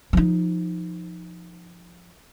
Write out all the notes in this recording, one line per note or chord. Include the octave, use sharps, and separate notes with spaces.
F3 D#4